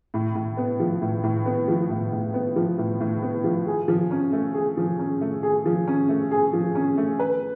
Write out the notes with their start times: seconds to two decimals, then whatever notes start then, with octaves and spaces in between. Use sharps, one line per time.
0.14 A2
0.35 A2
0.57 B3
0.80 F3
1.02 A2
1.23 A2
1.46 B3
1.68 F3
1.90 A2
2.12 A2
2.34 B3
2.56 F3
2.78 A2
3.00 A2
3.23 B3
3.44 F3
3.67 G#4
3.88 F3
4.11 C#4
4.33 A3
4.55 G#4
4.77 F3
4.99 C#4
5.21 A3
5.43 G#4
5.66 F3
5.87 C#4
6.09 A3
6.31 G#4
6.53 F3
6.75 C#4
6.98 A3
7.19 B4